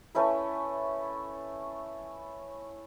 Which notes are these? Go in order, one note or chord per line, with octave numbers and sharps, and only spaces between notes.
A3 C#4 E4 B4